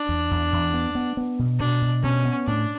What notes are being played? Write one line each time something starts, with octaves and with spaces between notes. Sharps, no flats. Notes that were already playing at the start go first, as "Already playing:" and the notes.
Already playing: D4
E2
E2
E2
B3
B3
B3
B2
B2 D4
B2
B2 C#4
B3
A2 D4